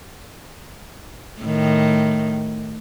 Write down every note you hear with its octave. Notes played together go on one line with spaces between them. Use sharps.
A2 D#3